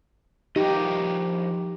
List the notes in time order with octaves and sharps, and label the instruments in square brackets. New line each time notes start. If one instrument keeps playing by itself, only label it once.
[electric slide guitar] F3 A#4 D#5 [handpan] D#4 G4